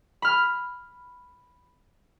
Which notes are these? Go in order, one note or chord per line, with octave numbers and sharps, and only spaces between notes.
B5 F6